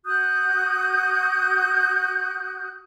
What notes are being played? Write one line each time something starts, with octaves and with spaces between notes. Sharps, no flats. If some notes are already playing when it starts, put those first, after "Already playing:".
F#4 D#6 F#6 G6